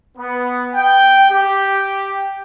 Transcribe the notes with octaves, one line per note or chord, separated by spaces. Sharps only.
B3
G5
G4